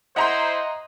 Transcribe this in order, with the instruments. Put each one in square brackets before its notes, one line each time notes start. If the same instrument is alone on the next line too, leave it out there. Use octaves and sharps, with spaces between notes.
[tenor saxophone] E4 [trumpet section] C5 [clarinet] D#5 [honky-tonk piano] F#5 A#5 C6